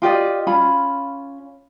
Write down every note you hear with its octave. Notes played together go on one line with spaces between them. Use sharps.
F4 G4 D5 D#5
C#4 F4 B5